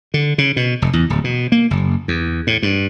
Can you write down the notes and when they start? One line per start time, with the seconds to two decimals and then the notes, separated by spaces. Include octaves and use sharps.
0.14 D3
0.38 C#3
0.56 B2
0.82 F1
0.93 E2
1.10 D1
1.24 B2
1.52 A#3
1.71 F#1
2.08 E2
2.47 A2
2.63 G2